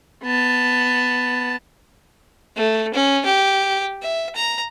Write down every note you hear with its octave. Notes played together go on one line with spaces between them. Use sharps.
B3 A5
A3
C#4
G4
E5
A#5